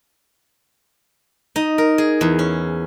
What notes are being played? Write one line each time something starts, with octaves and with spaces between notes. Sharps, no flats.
D#4
A#4
G#4
E2
C#4